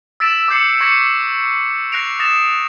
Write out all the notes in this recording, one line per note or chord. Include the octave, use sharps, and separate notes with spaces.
E6 A6 B6 D7 E7
D6 E6 G6 C7 C#7
C#6 G#6 A#6 B6 C#7
F#6 A#6 C7 D7 F7
D#6 A6 A#6 E7 F7